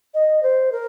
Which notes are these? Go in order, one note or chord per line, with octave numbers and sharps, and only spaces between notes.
D#5
C5
A#4